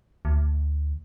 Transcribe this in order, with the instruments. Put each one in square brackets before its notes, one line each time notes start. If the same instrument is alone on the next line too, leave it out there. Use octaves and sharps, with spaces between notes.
[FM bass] D2